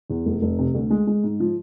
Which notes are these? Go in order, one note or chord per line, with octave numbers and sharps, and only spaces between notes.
E2
F1
F1
C3
D2
G#3
G#3
G#2
F3